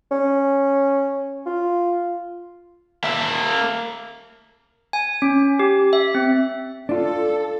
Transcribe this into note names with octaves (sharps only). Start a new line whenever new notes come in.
C#4
F4
A#3 E5
G#5
C#4
G4
E5
C4
D4 F4 A4